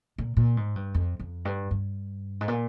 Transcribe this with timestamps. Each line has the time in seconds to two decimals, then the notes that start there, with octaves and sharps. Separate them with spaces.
0.18 A#2
0.37 A#2
0.57 G#2
0.76 G2
0.94 F2
1.20 F2
1.45 G2
1.71 G2
2.41 G#2
2.48 A#2